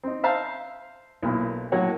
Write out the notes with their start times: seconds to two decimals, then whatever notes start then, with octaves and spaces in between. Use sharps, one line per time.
0.03 C4 D#4
0.24 C5 E5 F5 A5 A#5
1.22 B1 A#2 E4
1.72 A2 F#3 A#3 C#5 F#5